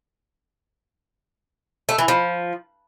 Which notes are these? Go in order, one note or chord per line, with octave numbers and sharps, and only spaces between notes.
A3
E3
F3